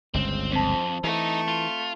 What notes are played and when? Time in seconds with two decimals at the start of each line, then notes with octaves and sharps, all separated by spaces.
0.14 G1 C#2 C#3 C4
0.51 F2 C4 A5
1.04 E3 A3 D#4
1.48 F4